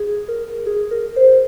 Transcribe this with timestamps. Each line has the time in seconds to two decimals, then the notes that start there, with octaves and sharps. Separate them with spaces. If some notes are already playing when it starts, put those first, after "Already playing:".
Already playing: G#4
0.28 A#4
0.66 G#4
0.91 A#4
1.16 C5